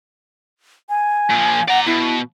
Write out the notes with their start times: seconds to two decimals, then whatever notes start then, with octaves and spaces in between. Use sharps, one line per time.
0.89 G#5
1.30 A#2 F3
1.68 D5 F#5 A#5
1.87 B2 E4